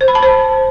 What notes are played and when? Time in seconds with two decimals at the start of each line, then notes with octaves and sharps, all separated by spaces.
0.01 C5
0.08 B5
0.15 A5
0.23 C5